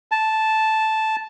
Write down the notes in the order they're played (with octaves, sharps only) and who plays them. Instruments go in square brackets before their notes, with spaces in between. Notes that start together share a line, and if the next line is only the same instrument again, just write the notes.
[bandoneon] A5